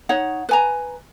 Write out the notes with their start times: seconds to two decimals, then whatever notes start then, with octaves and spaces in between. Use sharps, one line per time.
0.09 D#4 C#5 F#5
0.49 B4 G#5 A#5